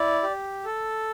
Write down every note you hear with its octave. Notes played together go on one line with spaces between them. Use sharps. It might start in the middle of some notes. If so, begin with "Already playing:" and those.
Already playing: E4 D5
G4
A4